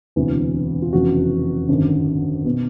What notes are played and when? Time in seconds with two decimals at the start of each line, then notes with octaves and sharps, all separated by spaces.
0.16 E1 D2 C3 E3
0.82 F4
0.92 F1 E2 C#3 F#4
1.69 G#1 F#2 D3
2.45 B2